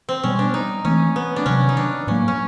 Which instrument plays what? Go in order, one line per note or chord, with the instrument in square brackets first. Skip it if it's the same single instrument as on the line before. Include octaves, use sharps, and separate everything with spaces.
[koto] C4
[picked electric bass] B2 G3 B3 [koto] C#4
[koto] D4
D#4
[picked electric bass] E3 A3 C4 [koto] C#4
[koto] B3
D4
[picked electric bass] C3 D#3 F#3 [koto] C#4
[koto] D#4
D4
[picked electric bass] A2 F#3 A#3 [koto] C#4
[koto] C#4